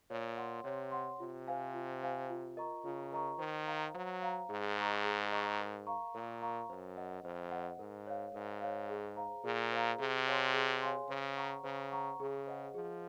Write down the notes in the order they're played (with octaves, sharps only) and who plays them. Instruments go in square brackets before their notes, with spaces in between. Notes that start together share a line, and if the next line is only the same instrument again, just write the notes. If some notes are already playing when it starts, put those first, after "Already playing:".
[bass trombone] A#2 [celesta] C#5
[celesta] F#5 C6
[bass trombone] C3 [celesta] C#5
[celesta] F#5 C6
[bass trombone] C3 [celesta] F4
[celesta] C5 F5 G#5
F4
C5 F5 G#5
F4
A#4 D#5 A#5 C#6
[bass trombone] C#3 [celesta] F4
[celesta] A#4 D#5 A#5 C#6
[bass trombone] D#3 [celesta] C5
[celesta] F5 A#5
[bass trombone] F#3 [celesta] C5
[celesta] F5 A#5
[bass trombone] G#2 [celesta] G#4
[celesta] D#5 A#5 C#6
G#4
D#5 A#5 C#6
A#4
F5 A#5 C#6
[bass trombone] A#2 [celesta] A#4
[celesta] F5 A#5 C#6
[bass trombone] F#2 [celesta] C5
[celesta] D#5 F#5
[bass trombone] F2 [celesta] C5
[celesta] D#5 F#5
[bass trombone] G#2 [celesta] A#4
[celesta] C#5 F5
[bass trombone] G#2 [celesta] A#4
[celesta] C#5 F5
G#4
C5 F5 A#5
[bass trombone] A#2 [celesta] G#4
[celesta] C5 F5 A#5
[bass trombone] C3 [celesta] G#4
[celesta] C#5 F5 G#5 C6
G#4
C#5 F5 G#5 C6
[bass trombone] C#3 [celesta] C5
[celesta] F#5 A#5 C#6
[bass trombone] C#3 [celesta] C5
[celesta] F#5 A#5 C#6
[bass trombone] C#3 [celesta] G#4
[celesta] C5 D#5 F#5
[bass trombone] F3 [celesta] G#4